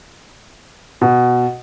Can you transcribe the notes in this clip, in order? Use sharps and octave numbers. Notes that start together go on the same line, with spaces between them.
B2